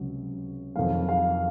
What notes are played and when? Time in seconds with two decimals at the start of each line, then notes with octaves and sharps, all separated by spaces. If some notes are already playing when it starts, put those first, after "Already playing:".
Already playing: C#2 C3 F#3
0.76 F2 D#3 F#3 F5
1.09 F5